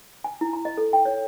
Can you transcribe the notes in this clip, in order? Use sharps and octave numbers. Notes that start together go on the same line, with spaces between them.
G#5
E4
A#5
D#5
A4
G5
C#5